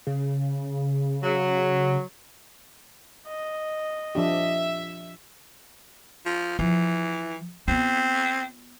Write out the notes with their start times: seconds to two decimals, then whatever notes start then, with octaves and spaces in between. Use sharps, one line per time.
0.07 C#3
1.23 F#3
3.27 D#5
4.15 F3 D4 G4 E5
6.26 F3
6.59 E3 F3
7.68 B3 C4 F4